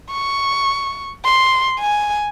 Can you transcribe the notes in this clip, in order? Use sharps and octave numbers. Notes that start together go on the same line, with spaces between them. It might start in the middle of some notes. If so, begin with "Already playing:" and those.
C#6
C6
G#5